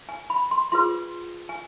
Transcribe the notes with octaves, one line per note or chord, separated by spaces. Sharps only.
G#5
B5
C6
F4 G#4 B4 C6
G#5